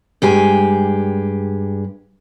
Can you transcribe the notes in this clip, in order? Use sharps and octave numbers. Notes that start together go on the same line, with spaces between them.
G2 G#3 G4 G#5